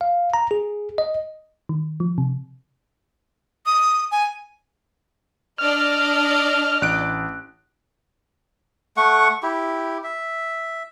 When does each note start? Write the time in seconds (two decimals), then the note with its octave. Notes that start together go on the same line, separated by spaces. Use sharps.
0.01 F5
0.34 A#5
0.51 G#4
0.98 D#5
1.69 D#3
2.00 F3
2.18 C3
3.66 D#6
4.11 G#5
5.58 D4 D5 D#5 F6
6.82 A1 F#6 D7
8.97 A3 F#5 C#6
9.43 E4 G4
10.04 E5